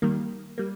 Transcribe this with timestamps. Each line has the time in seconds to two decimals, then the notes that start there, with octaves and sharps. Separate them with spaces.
0.02 D#3 G3 A#3
0.58 G3 A#3